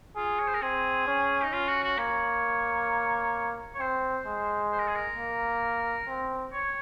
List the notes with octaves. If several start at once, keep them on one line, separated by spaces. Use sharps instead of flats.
F4 G#4
C#5
C5
A#4
C4 G#4
C#4
D#4
C#4 F4
F#4
F#4
A#3 C#5
C#5
C4 C5
G#3
C5
A#4
G#4
A#4
A#3
C4
C#5